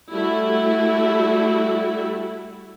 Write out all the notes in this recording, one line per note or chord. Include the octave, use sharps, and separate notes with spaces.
G3 A3 E4 F#4